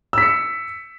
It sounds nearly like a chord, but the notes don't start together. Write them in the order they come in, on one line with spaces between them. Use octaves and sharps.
E6 B6 C#7